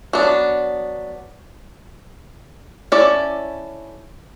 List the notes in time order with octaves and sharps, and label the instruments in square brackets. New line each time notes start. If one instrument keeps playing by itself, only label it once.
[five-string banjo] F#3 B3 D4
C#4 E4 A4 D5